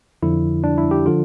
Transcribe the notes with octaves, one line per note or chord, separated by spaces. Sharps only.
F2 D3 F3 E4
D4
E4
G4
D3 F3 F4